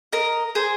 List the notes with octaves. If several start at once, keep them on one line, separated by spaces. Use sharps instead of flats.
A#4 D#5
G#4 C5